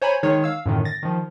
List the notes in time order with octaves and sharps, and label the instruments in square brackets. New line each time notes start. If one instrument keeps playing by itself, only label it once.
[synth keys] C5 C#5 G#5 A#5 B5
D#3 G#3 D#4 G#4 C#5
F5 E6
F#2 A2 D3 D#3
A6 A#6
D#3 F3